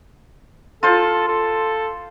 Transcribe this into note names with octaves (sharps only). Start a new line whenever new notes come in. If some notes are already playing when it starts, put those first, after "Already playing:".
F4 A4 C5
A4